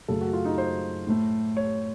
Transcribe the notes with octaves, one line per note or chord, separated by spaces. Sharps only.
F#2 C#3 A3 A4
F#4
F4
D#4
C5
A2 A3
C#5